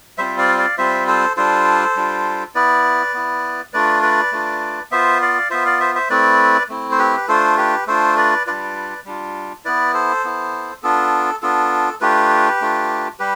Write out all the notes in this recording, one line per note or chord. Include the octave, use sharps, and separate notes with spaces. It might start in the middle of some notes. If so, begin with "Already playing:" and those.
G3 C4 F4 C5 E5
D5 F5
D5 F5
G3 C4 F4 C5 E5
A4 C5
G3 D4 F4 A4 C5
G3 D4 F4
B3 E4 B4 D5
B3 E4
A3 D4 F4 B4 D5
B4 D5
A3 D4 F4
B3 F4 C5 E5
D5 F5
B3 F4 C5 E5
D5 F5
C5 E5
C5 E5
A3 C4 E4 B4 D5
A3 C4 E4
C5
G4 B4
B4
A3 D4 F4 A4 C5
G4 B4
A3 D4 F4 A4 C5
B4 D5
G3 D4 F4 B4 D5
G3 D4 F4
B3 E4 B4 D5
A4 C5
B3 E4
B3 D4 F4 A4
B3 D4 F4 A4
A3 D4 F4 G4 B4
A3 D4 F4
G3 G4 B4